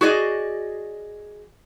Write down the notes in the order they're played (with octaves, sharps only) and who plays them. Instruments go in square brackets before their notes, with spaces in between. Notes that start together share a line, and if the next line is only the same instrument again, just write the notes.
[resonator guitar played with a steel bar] F#4 G#4 D5 D#5